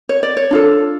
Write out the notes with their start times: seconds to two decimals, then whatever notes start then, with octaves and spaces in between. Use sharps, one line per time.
0.09 C#5
0.23 D5
0.37 C#5
0.51 D4 F4 A4